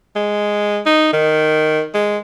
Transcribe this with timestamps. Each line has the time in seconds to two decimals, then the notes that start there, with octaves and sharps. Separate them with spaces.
0.16 G#3
0.86 D#4
1.13 D#3
1.94 G#3